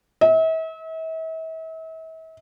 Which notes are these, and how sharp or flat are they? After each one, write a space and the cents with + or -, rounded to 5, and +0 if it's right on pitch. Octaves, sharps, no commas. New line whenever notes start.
E5 -40